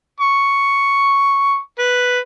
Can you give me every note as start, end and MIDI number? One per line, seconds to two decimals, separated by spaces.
0.20 1.58 85
1.79 2.19 71